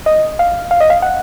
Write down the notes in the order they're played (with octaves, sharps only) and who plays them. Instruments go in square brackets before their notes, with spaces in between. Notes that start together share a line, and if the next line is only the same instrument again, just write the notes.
[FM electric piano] D#5
F5
F5
D#5
F5
F#5